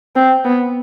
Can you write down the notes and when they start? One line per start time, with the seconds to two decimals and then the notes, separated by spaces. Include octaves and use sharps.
0.16 C4
0.45 B3